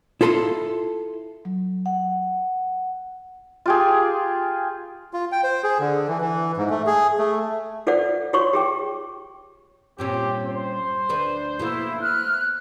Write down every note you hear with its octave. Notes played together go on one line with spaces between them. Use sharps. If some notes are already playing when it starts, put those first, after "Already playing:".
E4 F4 A4 B5 C6
F#3
F#5
F4 G4 G#4
F4
G5
C5
G#4
D3
E3
E3
G#2
A3
G#4
A3
F4 A4 C5 D5 F#5
F4 F#4 C#5 C6 C#6
G4 G#4 G5
G2 A#2 C4 C#4 G4
C5
D2 D4 B4
B2 A3 A#3 E4
F6 F#6